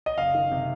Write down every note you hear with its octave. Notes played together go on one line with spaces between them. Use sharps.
D#5
F#1 F5
D#3
C3